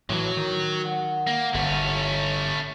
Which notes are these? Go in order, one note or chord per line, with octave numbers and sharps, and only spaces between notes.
A2 E3 F#3
D#3
D#5 F#5
A#3
G1 A3 C#4
C#5 F5 A#5